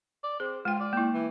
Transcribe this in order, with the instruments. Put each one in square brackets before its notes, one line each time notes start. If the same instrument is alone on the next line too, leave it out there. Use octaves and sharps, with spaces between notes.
[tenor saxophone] D5
[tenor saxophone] C4 [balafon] G#4
[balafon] G#3 G5 [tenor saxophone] F4
[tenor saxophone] D5
[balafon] A#3 E4
[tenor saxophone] E3